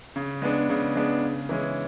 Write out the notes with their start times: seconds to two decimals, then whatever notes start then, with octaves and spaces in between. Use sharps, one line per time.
0.16 C#3
0.42 G#3 B3 D4
0.69 C#3
0.96 G#3 B3 D4
1.23 C#3
1.49 E3 G#3 C#4